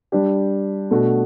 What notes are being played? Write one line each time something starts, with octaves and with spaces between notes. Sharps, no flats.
G3 D4 G4
B2 A3 D4 F#4